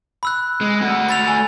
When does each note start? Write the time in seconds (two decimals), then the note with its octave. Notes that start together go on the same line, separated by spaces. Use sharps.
0.23 B5 E6 F#6
0.61 G#3
0.81 A3 F#4
1.09 B5 A6 F7
1.28 G#5